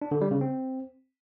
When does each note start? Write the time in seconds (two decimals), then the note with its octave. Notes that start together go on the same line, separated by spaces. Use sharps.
0.02 D4
0.11 D3
0.21 G3
0.31 C#3
0.41 C4